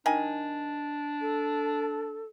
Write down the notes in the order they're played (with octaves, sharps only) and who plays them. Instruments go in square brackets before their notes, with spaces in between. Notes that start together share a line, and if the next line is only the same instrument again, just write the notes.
[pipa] D#3 G#5 [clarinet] D4
[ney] A4